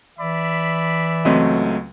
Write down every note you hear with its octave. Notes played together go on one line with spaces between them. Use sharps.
E3 D5 E5 B5
C#2 F#3 A3 C4 D#5